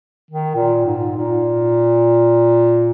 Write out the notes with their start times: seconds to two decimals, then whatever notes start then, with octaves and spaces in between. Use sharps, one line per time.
0.31 D#3
0.55 A#2
0.85 G#2
1.17 A#2